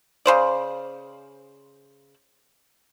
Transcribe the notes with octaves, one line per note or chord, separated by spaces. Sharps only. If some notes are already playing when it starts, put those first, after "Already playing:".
C#3 C5 D5